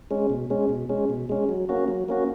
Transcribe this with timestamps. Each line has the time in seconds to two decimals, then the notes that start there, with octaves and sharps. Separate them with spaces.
0.11 G#3 C#4
0.30 B2
0.50 G#3 C#4
0.69 B2
0.89 G#3 C#4
1.10 B2
1.29 G#3 C#4
1.49 F#3
1.69 A#3 C#4 F#4
1.88 F#3
2.09 A#3 C#4 F#4